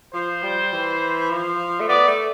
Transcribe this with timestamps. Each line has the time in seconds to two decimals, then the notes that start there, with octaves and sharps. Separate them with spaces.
0.14 F3 C5
0.43 G3
0.73 E3
1.30 F3
1.80 A3
1.89 B3 D5
2.08 A3